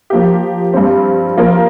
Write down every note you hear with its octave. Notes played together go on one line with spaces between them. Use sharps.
F3 A#3 G4
G2 G3 C4
F3 A#3 F4 A#4